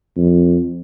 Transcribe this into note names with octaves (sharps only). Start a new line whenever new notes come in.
F2